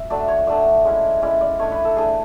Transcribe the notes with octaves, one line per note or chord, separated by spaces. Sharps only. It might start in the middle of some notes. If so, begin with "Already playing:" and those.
Already playing: E5
F#3 A3 D4 D5
C#5
F#3 A3 D4 D5
G#3 C#4 E4
G#3 C#4 E4 D5
D5
A3 D4 C#5
B4
A4
A3 D4 G#4